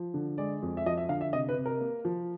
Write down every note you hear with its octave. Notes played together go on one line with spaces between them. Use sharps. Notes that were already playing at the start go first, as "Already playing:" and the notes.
Already playing: F3
D3
G#3 D5
F2
E5
F3 D#5
E5
D3 F5
E5
C3 D#5
B4
C3
A#4
A#3
F3